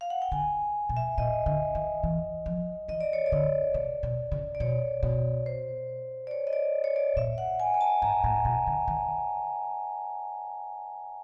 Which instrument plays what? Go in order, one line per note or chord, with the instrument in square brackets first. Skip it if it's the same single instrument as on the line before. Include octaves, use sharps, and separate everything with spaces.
[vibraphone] F5
F#5
G5
[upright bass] D3 [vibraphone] G#5
[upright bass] B2
[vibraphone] E5
[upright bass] A#2 [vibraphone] D#5
[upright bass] D3
D#3
E3
F3
[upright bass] E3 [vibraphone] D#5
[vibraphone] D5
C#5
D5
[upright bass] D3
C3
B2
C#3
[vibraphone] D5
[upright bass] B2 [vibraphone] C#5
[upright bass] B2
[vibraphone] C5
D5
C#5
D#5
D5
C#5
D5
[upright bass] A#2 [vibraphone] E5
[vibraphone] F#5
G#5
G#5
A5
[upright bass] G#2 [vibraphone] A#5
[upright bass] A2
B2
D3
D#3